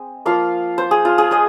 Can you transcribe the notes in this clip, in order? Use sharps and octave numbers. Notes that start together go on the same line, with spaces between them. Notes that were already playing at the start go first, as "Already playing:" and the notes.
Already playing: G#3 C4
F3 A#3 F4 F5
C5
G#4
F4
G#4
G#3 D#5